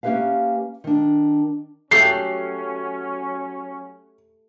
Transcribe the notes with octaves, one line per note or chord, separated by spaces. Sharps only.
A#3 C#4 G4 B4 E5 F5
D#3 D4
F#3 A3 C#4 G4 A4 C7